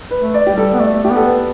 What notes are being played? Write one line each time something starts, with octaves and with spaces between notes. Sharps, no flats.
B4
A3
D5
G3 G4
A4
B3
A3 D5
A3 G4
B3
A4
B4